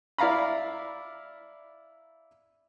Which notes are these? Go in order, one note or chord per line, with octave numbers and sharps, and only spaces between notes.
E4 D5 F5 A#5 B5